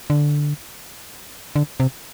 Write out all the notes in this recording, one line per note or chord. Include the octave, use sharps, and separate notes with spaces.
D3
D3
C3